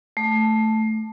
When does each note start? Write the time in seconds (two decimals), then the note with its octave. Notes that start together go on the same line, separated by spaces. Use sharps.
0.17 A3